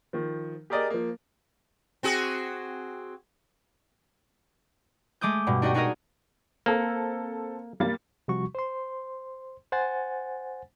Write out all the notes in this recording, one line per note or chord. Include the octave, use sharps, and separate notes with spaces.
D#3 F3
G4 G#4 A#4 D5 D#5
F3 A#3
C4 F#4 G#4
G#3 A3 D6 D#6 G6
G2 B2
D4 D#4 F#4 G4 D#5 C#6
D4 D#4 F#4 G#4 A#4 D#5
A#3 C4 A4
G3 A#3 A6
C3 F3 G3 F#4 C#6
C5 C6
C5 F#5 G#5 A6